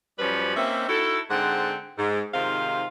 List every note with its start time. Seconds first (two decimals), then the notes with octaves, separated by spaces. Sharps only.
0.19 F#2 F3 G3 C#4 B4 C5
0.56 A#3 C4 C#4 D#4 E5
0.88 D#4 E4 F#4 A4
1.30 G#2 D3 G#3 C4 F#5
1.99 G#2
2.34 G#2 C3 D#3 F4 C5 F5